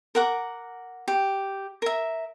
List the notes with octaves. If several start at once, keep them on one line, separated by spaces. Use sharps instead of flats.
A#4 F#5 D6
G4
A#4 E5